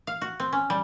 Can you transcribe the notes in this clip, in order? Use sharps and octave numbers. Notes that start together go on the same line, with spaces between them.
F5
F#4
C4
C#4
G3